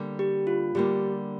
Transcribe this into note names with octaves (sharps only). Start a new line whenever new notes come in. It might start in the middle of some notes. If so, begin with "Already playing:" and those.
Already playing: D3 G3 A#3
G4
F4
D3 G3 A#3 G4